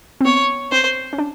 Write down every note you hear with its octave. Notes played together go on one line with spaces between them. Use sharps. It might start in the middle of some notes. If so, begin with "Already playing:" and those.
C4
B3 C#5
C4 C5
C#4
D4